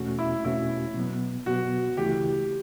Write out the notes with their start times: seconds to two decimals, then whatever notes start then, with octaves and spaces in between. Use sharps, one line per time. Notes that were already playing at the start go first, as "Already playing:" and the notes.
Already playing: E2 B2 A3 C#4 F#4
0.19 E4
0.44 E2 B2 A3 C#4 E4 F#4
0.95 B2 F#3 B3
1.46 B2 F#3 B3 F#4
1.97 D2 C#3 E3 A3 E4 G4